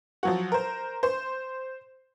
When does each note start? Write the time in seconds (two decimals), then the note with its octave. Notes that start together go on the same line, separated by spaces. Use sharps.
0.23 F3 F#3 F#4
0.52 A#4 C5
1.03 C5 C6